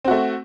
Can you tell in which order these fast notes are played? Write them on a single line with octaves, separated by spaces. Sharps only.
C4 F#4 A3